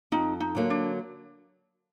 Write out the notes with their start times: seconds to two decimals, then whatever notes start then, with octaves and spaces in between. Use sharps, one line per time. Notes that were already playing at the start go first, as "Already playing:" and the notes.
0.12 F2 D#4
0.40 D#4
0.55 D3 F#3 A#3
0.70 D4